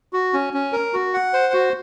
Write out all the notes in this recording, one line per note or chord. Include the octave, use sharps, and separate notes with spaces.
F#4
C#4
C#4
A#4
F#4
F#5
C5
F#4